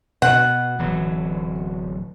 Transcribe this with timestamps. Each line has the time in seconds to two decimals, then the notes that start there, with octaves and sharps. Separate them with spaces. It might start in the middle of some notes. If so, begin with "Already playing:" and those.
0.22 B2 B3 F#5
0.79 D1 E3 F#3